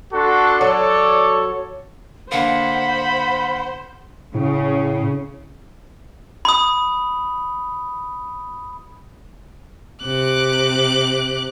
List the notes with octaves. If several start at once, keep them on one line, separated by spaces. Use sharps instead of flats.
D4 F#4 A4 C6
F#3 A4 C#5 D5
D3 A#3 C5 F#5 B5
A2 C#3
B5 D#6
C3 D6 F#6